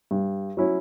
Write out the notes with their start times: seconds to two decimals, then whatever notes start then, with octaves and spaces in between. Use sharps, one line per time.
0.11 G2
0.57 F#3 C#4 E4